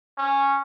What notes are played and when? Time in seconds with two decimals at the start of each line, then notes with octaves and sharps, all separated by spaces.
0.18 C#4